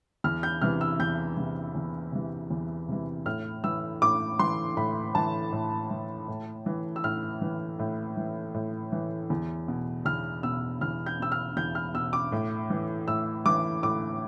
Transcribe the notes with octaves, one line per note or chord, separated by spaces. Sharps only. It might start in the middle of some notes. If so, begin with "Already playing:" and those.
E2 F6
G6
C3 E3 F6
E6
E2 G6
C3 E3
E2
C3 E3
E2
C3 E3
A2 F6
E3 E6
A2 D6
E3 C6
A2 B5
E3 A5
A2
E3
A2
E3
E6
A2 F6
E3
A2
E3
A2
E3
E2
B2
E2 F6
B2 E6
E2 F6
G6
B2 E6
F6
E2 G6
F6
B2 E6
D6
A2
E3
A2 E6
E3 D6
A2 D6